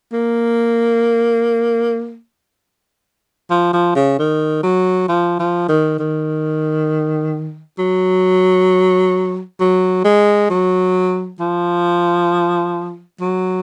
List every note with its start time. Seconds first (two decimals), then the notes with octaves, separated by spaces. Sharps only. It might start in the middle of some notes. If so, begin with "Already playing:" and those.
0.13 A#3
3.51 F3
3.74 F3
3.95 C#3
4.19 D#3
4.63 F#3
5.09 F3
5.40 F3
5.69 D#3
5.99 D#3
7.79 F#3
9.60 F#3
10.05 G#3
10.50 F#3
11.40 F3
13.21 F#3